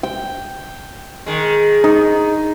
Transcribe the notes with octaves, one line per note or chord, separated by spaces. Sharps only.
G5
D#3 G#3
D#4